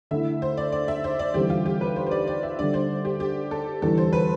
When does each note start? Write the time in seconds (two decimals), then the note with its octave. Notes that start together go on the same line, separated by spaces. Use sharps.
0.11 D3 A3 E4 E5
0.42 C5
0.57 D5
0.72 D5
0.88 E5
1.04 C5
1.19 D5
1.34 E2 D3 G3 C4 G4
1.50 F4
1.66 G4
1.81 B4
1.96 C5
2.06 C5
2.11 D5
2.28 D5
2.43 E5
2.58 D3 G3 D4 D5
2.74 C5
3.05 G4
3.20 G4
3.51 A4
3.82 E2 D3 G3 A4
3.98 C5
4.13 B4